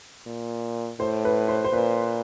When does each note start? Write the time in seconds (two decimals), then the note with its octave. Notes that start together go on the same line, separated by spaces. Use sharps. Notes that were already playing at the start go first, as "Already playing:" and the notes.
0.26 A#2
0.99 A2 C5
1.25 B4
1.48 C5
1.64 C5
1.73 A#2 B4